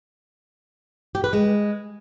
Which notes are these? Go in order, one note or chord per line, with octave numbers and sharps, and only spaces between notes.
G4
B4
G#3